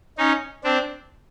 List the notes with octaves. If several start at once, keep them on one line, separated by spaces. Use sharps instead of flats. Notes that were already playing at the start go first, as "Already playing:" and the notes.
C#4 D#4
C4 D4